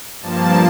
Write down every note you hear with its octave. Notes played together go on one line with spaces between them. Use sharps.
G2 F3 A#3 A5